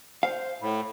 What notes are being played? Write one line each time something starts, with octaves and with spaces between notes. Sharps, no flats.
C5 F5
A2 B5